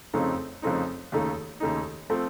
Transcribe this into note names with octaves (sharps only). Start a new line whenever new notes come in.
F2 C#3 A3 C4 D#4
F2 C#3 A3 C4 D#4
D#2 C#3 A3 D#4
D#2 C#3 A3 D#4
F3 A3 C4